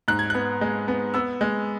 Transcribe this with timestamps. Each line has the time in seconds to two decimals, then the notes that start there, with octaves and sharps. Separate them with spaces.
0.08 G#2 F#6
0.19 G#6
0.30 B3 F#6
0.61 G#3
0.88 B3
1.14 B3 E6
1.41 G#3